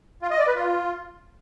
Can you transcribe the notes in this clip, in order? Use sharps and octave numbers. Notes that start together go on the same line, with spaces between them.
F4
D#5
D5
B4
F4